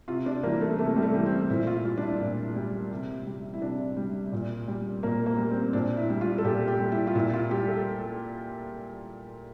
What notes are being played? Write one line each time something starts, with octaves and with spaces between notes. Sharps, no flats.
C3 F4
D4
E3 G3 A#3
A3
C3 A3
G3
A3
E3 G3
C4
A#2 E4
F4
G3 F4
D4
E4
A#2
G3
C3
G3
E4
C3 D4
G3
A#2
G3
A#2 A#3
A#3
G3
C4
A#2 D4
E4
G3
F4
A4
A#2 G4
G4
G3
E4
F4
A#2 E4
F4
G3 G4
A4